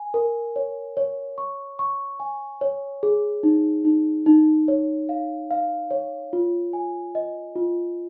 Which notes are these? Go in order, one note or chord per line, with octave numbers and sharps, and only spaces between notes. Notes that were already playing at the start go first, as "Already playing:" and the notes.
Already playing: G#5
A#4
C#5
C#5
C#6
C#6
G#5
C#5
G#4
D#4
D#4
D#4
C#5
F5
F5
C#5
F4
G#5
D#5
F4